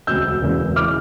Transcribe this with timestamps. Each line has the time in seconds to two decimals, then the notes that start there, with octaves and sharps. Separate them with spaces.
0.07 E1 D2 C#3 E6 G6
0.42 E1 E2 C#3 E3 A#3
0.76 C#3 E3 D6 F6